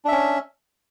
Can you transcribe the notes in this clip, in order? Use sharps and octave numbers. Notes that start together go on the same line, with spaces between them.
C#4 D4 E5